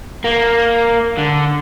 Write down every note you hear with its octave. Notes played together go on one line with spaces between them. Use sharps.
A#3
D3